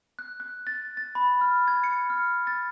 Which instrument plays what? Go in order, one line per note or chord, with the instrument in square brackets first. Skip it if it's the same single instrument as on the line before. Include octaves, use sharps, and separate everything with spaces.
[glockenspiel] F#6
F#6
A6
A6
B5
F6
G#6
C#7
F6
A6